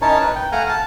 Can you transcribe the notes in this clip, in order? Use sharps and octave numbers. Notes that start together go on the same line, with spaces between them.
C#4 D#4 E4 A#4 C#5 A5
B4
G5
A3 F5 F#5 G#5 A#5
A5